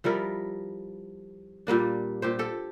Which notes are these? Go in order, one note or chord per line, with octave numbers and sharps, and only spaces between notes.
F3 G3 E4 A#4
A#2 G3 A#3 D4
A#2 G4 C5
G4 A4